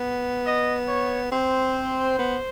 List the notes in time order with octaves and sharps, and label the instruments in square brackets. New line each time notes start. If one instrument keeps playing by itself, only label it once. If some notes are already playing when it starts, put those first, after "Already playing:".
Already playing: [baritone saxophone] B3
[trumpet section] D#5
C#5
[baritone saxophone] C4 [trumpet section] C5
[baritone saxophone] B3